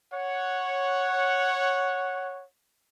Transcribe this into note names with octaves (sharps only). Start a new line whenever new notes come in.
C#5 F#5